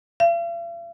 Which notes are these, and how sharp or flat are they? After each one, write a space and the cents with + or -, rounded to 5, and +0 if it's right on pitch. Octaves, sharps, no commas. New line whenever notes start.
F5 -45